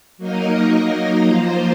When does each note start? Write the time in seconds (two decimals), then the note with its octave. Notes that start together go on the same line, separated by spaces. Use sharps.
0.18 F#3 A#3 D#4 A#4 D#5
1.25 F3 A#3 F4 C5